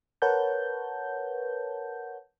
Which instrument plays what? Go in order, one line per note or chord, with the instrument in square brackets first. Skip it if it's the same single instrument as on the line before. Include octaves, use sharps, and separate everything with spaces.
[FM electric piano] A#4 B4 C#5 F#5 A5 G6